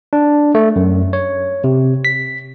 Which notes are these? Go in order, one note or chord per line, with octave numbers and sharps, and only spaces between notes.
D4
A3
F#2
C#5
C3
B6